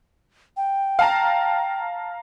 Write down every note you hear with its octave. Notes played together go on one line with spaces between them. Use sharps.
G5
F5 A5 A#5